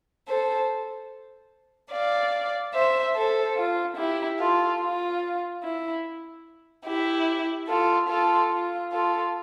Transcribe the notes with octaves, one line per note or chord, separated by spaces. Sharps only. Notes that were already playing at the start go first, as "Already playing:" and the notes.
A4 C5
D5 F5
C5 E5
A4 C5
F4
E4 G4
F4 A4
F4
E4
E4 G4
F4 A4
F4 A4
F4
F4 A4